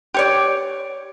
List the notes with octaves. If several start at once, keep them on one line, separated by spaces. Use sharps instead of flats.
G4 C#5 D5